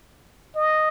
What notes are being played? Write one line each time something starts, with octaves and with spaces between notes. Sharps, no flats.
D#5